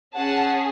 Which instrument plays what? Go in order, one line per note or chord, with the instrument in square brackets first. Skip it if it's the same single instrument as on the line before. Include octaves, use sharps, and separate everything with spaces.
[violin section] C#4 G#4 F#5 A5